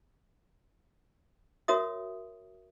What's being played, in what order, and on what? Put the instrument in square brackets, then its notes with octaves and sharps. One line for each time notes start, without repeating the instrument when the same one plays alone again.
[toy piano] F#4 A#4 C#5 E5 D#6